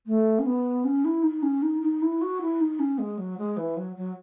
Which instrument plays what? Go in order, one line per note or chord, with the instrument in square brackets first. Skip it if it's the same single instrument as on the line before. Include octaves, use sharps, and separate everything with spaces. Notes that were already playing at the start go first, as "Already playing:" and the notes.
[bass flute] A3
C#4
B3
C#4
E4
D#4
C#4
D#4
D#4
E4
F#4
E4
D#4
C#4
G#3
F#3
G#3
E3
F#3
F#3